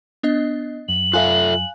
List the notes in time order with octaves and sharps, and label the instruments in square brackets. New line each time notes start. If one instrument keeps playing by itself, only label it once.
[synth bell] B3 D4 D#5
[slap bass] F#2 [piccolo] F#7
[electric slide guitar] F4 A4 E5 [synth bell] F5 G#5 F#6